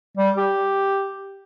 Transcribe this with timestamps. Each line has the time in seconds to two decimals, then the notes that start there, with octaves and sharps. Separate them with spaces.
0.17 G3
0.38 G4